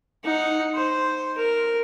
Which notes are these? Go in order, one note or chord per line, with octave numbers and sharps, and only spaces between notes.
D#4 F#5
C5
A#4